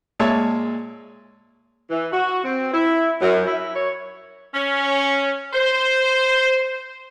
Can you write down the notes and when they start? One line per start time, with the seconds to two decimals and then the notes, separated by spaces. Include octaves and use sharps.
0.19 A#2 G#3 C#5 E5 A5
1.90 E3
2.12 F#4
2.44 C4
2.72 E4
3.21 F#2
3.46 E4
3.74 C#5
4.54 C#4
5.53 C5